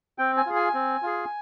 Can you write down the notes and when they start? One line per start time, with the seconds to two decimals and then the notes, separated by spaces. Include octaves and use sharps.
0.18 C4 G5
0.37 G#5
0.46 F4 G#4
0.56 G#5
0.74 C4
1.02 F4 G#4